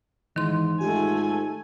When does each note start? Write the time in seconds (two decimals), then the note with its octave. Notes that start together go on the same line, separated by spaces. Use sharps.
0.36 G#2 D#3 E3 C6
0.81 G#2 A3 F4 G4 G#5